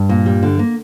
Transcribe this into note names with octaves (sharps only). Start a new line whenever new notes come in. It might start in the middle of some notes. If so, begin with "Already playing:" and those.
Already playing: G2
A#2
G3
D3
A#3